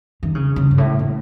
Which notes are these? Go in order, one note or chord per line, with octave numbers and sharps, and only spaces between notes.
D#3
C#3
C#3
G#2
A2
A2